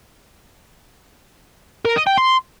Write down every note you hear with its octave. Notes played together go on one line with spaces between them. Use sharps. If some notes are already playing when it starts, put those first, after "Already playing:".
A#4
D#5
G5
C6